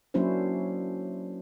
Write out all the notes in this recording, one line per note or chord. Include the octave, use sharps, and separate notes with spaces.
F#3 A#3 C#4 D4 E4 C5